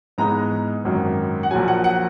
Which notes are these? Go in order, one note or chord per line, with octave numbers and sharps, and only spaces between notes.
G#2 E3 G#3 B3 D#4 A#5
G#1 F#2 D#3
F#5
A#1 A#2 F#3 G#5
F#5
F#5